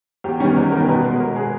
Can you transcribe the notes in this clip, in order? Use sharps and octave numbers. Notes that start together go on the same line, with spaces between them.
E2 G4
D#3 G3 B3 C#4
E2
D#3 G3 B3 A#4
B2 B4
G#3 B3
B2 A#4
G#3 B3 G#4